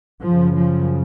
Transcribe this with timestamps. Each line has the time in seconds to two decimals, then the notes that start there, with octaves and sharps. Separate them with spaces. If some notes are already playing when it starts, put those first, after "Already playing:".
0.23 F#2 C#3 F3
0.55 F3